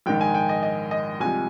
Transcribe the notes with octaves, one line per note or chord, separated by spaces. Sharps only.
A#1 G#2 D#3 G#3 G5
G#5
G5
D#5
D#5
D#5
C2 C3 F3 G#3 G#5